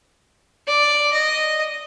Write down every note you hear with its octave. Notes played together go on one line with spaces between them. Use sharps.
D5
D#5